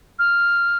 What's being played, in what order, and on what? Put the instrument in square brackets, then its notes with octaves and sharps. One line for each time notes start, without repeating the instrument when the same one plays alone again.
[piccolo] F6